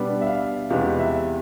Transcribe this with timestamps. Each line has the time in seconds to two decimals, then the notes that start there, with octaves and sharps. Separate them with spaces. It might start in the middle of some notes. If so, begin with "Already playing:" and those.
Already playing: B2 G3 B3 D4
0.21 E5
0.27 F5
0.70 E2 C3 E3 G#3 B3 F5
1.00 E5